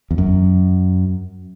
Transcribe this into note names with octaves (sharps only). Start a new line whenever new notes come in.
E2
F#2